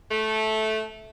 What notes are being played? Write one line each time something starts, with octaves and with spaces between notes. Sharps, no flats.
A3